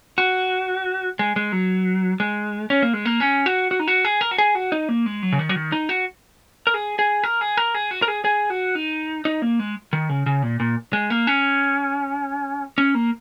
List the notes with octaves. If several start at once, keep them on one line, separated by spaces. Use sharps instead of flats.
F#4
G#3
G#3
F#3
G#3
C#4
A#3
G#3
A#3
C#4
F#4
F#4
D#4
F#4
G#4
A#4
F#4
G#4
F#4
D#4
A#3
G#3
F#3
C#3
D#3
F#3
D#3
D#4
F#4
A#4
G#4
G#4
A#4
G#4
A#4
G#4
F#4
A#4
G#4
G#4
F#4
D#4
D#4
A#3
G#3
D#3
C#3
C#3
A#2
A#2
G#3
A#3
C#4
C#4
A#3